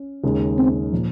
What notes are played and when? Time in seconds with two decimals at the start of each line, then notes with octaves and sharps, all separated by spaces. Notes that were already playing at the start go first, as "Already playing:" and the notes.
Already playing: C#4
0.24 D#2 C#3 G#3
0.58 C4
0.92 A#2 F3